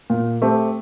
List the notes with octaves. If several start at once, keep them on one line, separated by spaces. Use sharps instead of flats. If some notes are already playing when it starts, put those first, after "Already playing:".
A#2
A3 C4 G4